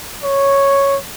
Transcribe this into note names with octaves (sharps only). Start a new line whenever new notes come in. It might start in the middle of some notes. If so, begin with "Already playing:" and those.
C#5